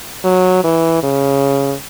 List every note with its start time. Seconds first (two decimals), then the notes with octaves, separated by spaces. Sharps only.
0.24 F#3
0.64 E3
1.03 C#3